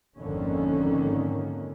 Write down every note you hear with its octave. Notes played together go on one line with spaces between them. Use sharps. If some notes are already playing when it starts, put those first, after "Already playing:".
G#1 F2 D3 D#3 A#3 C#4